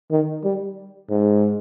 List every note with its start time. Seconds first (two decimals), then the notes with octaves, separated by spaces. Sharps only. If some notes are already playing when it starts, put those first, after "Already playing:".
0.11 D#3
0.44 G3
1.10 G#2